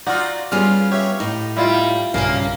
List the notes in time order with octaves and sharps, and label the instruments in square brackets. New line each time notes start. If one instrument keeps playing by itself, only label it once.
[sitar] D#4 F4 [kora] F#4 [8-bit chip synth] D5
[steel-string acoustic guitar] G3 B3 C#4 [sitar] F4 [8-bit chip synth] G#4 F6
[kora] G4 [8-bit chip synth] C#5 E5
[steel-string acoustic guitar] A2 [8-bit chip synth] D#4
[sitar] G3 [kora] E4 F4
[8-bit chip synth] B1 G2 F5 [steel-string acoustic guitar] C#3 C#4 [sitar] A#3